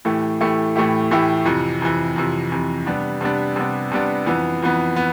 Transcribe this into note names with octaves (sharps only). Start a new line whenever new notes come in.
A2 E3 A3 E4 G4
A2 E3 A3 E4 G4
A2 E3 A3 E4 G4
A2 E3 A3 E4 G4
F2 C3 E3
F2 C3 E3
F2 C3 E3
F2 C3 E3
C3 G3 B3 D4
C3 G3 B3 D4
C3 G3 B3 D4
C3 G3 B3 D4
F2 E3 B3
F2 E3 B3
B3